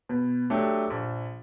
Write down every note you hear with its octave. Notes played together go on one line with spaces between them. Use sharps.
B2
F#3 A3 D4 G4
A#1